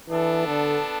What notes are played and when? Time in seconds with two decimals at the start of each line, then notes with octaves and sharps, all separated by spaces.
0.10 E3 B3 D4 A4
0.47 D3